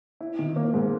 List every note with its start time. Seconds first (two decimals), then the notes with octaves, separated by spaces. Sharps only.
0.21 E4
0.39 D#3
0.56 A#3
0.74 G#2